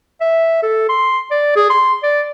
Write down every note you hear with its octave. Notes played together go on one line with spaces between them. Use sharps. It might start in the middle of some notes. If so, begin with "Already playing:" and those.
E5
A4
C6
D5
G#4
C6
D5